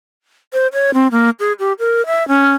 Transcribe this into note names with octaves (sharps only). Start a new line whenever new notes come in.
C5
C#5
C4
A#3
G#4
G4
A#4
E5
C#4